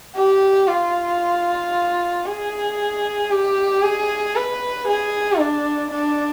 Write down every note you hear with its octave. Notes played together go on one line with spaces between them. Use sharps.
G4
F4
G#4
G4
G#4
B4
G#4
D4
D4